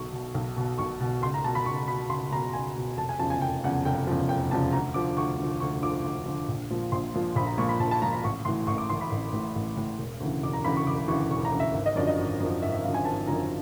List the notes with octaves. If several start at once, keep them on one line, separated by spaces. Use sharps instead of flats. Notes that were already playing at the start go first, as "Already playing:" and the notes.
Already playing: B1 B2 C#6
B2
B1
B2
B1 C#6
B2
C#2 C6
A#5
B2 A5
B5
C#2 C#6
B2 B5
C#2 C6
B2 A#5
C#2 G#5
B2
F1 A5
G#5
E2 C#3 F3 A5
G#5
F1 G5
E2 C#3 F3 F#5
F1 G5
E2 C#3 F3
F1 G5
E2 C#3 F3 A5
D2 A#5
D3 F3 D6
D2 C#6
D3 F3
D2 C#6
D3 F3 D6
D2
D3 F3
A#1
A#2 F3
A#1 C6
A#2 F3
A#1 B5
A#5
A#2 F3 C#6
B5
A#1 A5
A5
A#2 F3 A#5
B5
A1 C#6
A2 E3 C6
A1 C#6
D6
A2 E3 C6
B5
A1
A2 E3
A1
A2 E3
E1
D2 C#3 E3
E1 D6
A#5
D2 C#3 E3 B5
C#6
E1 D6
D2 C#3 E3 C#6
E1 C#6
A#5
D2 C#3 E3
E5
G#1 E5
D#5
F#2 D3 F3 D5
D#5
G#1
F#2 D3 F3
G#1 E5
E5
F#2 D3 F3 F5
G#5
G#1 A5
F#2 D3 F3 A#5